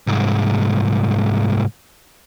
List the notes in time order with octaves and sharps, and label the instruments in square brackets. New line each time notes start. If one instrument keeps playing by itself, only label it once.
[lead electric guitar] C2 G#2